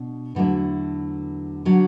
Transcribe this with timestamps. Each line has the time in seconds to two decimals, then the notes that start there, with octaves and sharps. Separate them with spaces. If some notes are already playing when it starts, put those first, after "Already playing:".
Already playing: B2 D4
0.35 E2 D3 F#3 A3 E4
1.65 D3 F#3